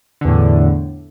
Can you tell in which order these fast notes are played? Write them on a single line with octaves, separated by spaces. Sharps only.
D3 E2 A2